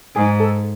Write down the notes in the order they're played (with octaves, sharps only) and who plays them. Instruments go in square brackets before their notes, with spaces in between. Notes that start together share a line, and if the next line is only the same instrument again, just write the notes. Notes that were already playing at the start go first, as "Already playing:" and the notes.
[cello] G#2 [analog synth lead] G#4
[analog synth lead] A4